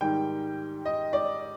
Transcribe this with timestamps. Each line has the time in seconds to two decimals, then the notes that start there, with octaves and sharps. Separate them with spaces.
0.01 G#2 D#3 G3 G5
0.86 D#5
1.13 D5